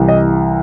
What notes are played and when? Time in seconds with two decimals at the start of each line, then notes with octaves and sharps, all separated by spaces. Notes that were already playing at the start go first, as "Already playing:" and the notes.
Already playing: C2 C3 E3
0.08 D#5